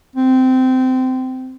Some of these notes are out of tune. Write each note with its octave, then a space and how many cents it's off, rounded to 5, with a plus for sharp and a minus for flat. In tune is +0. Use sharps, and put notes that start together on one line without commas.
C4 -20